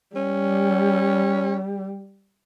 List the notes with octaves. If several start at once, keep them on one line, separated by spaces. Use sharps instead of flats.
G3 C#4